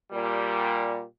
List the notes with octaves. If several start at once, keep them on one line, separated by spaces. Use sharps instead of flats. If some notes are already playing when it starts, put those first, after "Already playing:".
A#2 G3